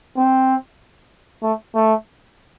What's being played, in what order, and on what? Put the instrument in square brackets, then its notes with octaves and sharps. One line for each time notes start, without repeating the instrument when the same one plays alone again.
[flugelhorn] C4
A3
A3